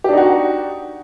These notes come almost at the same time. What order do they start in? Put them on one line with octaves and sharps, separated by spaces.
G4 D4 D#4 F#4